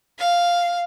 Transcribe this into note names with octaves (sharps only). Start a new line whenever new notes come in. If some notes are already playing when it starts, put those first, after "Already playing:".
F5